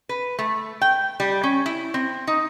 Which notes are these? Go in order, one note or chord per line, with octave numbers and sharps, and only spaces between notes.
B4
A3
G5
G3
C#4
E4
C4
D#4